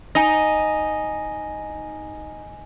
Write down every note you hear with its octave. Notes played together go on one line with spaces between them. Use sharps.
D#4 G#5 A#6